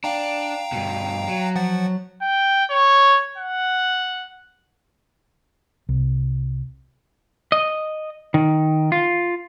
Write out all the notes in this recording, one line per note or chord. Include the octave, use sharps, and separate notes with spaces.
D4 F5 G5 A#5
G2 B2
F#3
F3 F#5 A6
G5
C#5
F#5
C2
D#5
D#3
F4